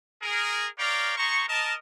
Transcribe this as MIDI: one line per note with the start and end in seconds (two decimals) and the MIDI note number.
0.23 0.69 68
0.23 0.69 70
0.78 1.17 70
0.78 1.17 73
0.78 1.17 74
0.78 1.17 77
0.78 1.17 79
0.78 1.17 82
1.17 1.44 68
1.17 1.44 72
1.17 1.44 82
1.17 1.44 85
1.49 1.74 70
1.49 1.74 75
1.49 1.74 81